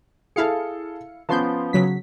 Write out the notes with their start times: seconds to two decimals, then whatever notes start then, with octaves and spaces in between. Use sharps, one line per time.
0.36 E4 G#4 A4 F5 C#7
1.29 F3 B3 C#4 A5 C6 G6
1.73 C#3 F#3 B6